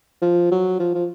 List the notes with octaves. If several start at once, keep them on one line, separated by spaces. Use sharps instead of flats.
F3
F#3
F3
F3